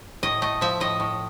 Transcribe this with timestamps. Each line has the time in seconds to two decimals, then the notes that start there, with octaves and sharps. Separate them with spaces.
0.23 A2 D#5
0.42 A3 D#5
0.61 F3 E5
0.80 A2 D#5
1.00 A2